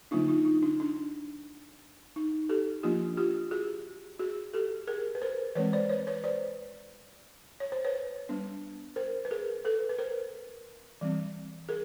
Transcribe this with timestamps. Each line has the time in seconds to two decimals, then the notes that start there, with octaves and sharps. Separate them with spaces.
0.11 D3 F#3 A#3 D4 D#4 F4
0.28 D#4 F4
0.45 D#4
0.62 D4
0.80 D4
2.16 D#4
2.49 G4 A4
2.83 F3 A#3 D4 F4 G4
3.17 F4 G4
3.51 F#4 G#4
4.19 F#4 G#4
4.54 G4 A4
4.87 G#4 A#4
5.15 B4
5.22 A#4 C5
5.55 E3 G#3 C4 B4 C#5
5.73 C5 D5
5.89 B4 C#5
6.07 B4 C#5
6.24 C5 D5
7.60 C#5
7.72 C5
7.84 B4 C#5
8.29 G3 B3 D4
8.96 A#4 C5
9.25 B4
9.31 G#4 A#4
9.65 A4 B4
9.89 B4
9.99 A#4 C5
11.01 E3 G3 C4
11.69 G#4 A#4